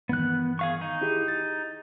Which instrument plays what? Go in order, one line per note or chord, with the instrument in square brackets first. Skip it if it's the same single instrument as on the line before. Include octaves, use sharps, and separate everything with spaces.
[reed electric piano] G2 D#3 E3 [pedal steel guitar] B3 F#6
[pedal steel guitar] G#4 F5 C#6
D#4
[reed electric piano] E4 G4 G#4
A6